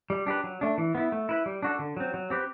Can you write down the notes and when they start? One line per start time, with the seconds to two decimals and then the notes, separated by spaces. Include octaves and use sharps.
0.10 G3
0.27 D4 G4 B4
0.44 F#3
0.61 A3 D4
0.78 E3
0.95 B3 E4
1.12 A3
1.29 E4 B4
1.46 G3
1.63 D4 F#4 A4
1.79 D3
1.97 F#3 C4
2.14 F#3
2.30 C4 G4 B4